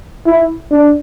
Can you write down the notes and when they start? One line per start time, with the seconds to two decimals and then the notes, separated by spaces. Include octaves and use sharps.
0.26 E4
0.71 D4